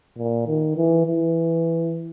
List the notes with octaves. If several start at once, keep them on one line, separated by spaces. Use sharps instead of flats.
A#2
D#3
E3
E3